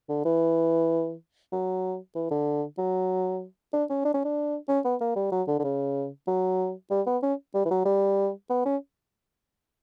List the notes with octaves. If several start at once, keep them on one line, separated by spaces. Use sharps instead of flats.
D3
E3
F#3
E3
D3
F#3
D4
C#4
D4
C#4
D4
C#4
B3
A#3
G3
F#3
D3
D3
C#3
F#3
G3
B3
C#4
G3
E3
F#3
G3
B3
C#4